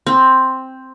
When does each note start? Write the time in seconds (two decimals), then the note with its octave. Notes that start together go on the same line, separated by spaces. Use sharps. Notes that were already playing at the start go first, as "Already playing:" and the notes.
0.07 C4